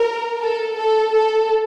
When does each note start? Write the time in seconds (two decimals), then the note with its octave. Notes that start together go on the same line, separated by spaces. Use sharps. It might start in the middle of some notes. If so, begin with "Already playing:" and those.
Already playing: A#4
0.41 A4
0.76 A4
1.12 A4